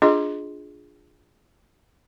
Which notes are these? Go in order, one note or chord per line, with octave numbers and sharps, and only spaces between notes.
D4 F4 G#4 D#5 C6